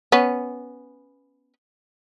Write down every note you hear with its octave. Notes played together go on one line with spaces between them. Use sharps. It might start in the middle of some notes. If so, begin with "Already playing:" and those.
B3 C#4